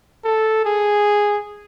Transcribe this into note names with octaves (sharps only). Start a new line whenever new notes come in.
A4
G#4